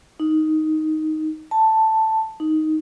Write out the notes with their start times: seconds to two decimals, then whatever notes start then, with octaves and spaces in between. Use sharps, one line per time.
0.20 D#4
1.51 A5
2.40 D#4